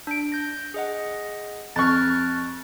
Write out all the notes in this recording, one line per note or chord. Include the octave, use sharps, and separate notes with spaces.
D4 D7
G6 A#6
G#4 D#5 F#5
F2 C#6 F6 F#6 A6